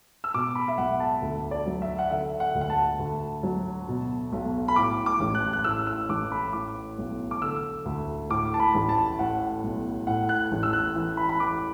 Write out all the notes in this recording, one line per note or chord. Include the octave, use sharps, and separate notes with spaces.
E6
B2 D6
B5
E5
B1 F#5
A5
D2
D5
F#3
E5
F#5
D3 E5
F#5
D2
F#5
A5
D2
F#3
B2
B1
B5
A2 D6
D6
A1
F#6
F#6
A2 E6
E6
A1 D6
B5
A2 D6
B1
D6
D3 E6
D2
A2 D6
A5
B5
A1
A5
A2 F#5
B1
A2 F#5
F#6
A1
E6
F#6
E3
B5
B5
E3 D6